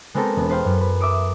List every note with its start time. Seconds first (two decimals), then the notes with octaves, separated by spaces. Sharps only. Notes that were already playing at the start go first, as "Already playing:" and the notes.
0.14 G#3 B3 C4 G4 A4 A#4
0.36 E1 B3
0.49 B4 C5 F5 G5
0.65 F#2
0.81 B4
1.01 E5 D6 D#6 D7